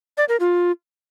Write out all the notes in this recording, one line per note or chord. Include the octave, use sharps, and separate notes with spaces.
D5
A#4
F4